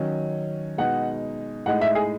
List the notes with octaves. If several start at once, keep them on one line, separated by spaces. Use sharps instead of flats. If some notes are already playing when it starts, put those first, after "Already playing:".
Already playing: D#3 F#3 C#4
B2 G#3 D#4 F#5
A2 G#3 D#4 F#5
E5
G#4